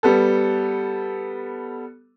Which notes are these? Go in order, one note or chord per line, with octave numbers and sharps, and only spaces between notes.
G3 B3 A4